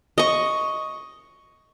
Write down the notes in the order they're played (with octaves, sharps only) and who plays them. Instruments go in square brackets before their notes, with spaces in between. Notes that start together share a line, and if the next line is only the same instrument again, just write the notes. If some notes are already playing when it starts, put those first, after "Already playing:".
[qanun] D#5 C#6